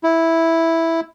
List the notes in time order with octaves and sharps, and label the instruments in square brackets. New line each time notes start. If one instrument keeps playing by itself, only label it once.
[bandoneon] E4